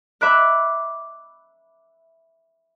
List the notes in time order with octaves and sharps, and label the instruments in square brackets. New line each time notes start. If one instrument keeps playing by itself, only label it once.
[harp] E5 B5 D6 F#6